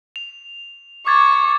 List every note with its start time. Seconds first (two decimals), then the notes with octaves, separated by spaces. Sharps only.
0.16 F7
1.07 C#6 D6 G#6 A6